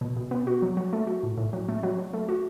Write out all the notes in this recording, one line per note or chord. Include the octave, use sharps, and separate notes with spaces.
B2
B2
B3
F#4
F#3
F#3
A3
F#4
A2
A2
F#3
A3
F#3
F#3
A3
F#4